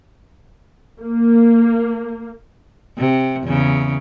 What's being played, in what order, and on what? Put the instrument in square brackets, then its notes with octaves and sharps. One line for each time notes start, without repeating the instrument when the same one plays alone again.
[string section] A#3
[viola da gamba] C3
E2 C#3